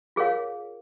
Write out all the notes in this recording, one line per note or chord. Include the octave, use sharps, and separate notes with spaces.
F4 G#4 A#4 C#5 F5